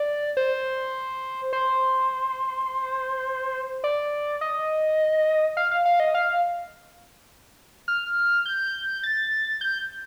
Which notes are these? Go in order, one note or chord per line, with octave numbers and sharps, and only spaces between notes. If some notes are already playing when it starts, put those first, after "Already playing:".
Already playing: D5
C5
C5
D5
D#5
F5
F5
F5
D#5
F5
F6
G6
A6
G6